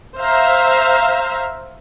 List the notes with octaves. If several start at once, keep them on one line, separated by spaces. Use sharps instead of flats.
C5 E5 F5 A#5